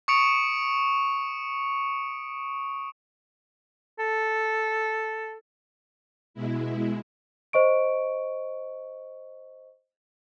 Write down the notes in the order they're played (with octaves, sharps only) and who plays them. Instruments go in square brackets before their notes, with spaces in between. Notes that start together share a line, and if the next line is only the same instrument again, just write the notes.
[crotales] C#6 D#6 C#7 D7 F7
[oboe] A4
[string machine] B2 G#3 E4
[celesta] C5 D#5 C#6 D7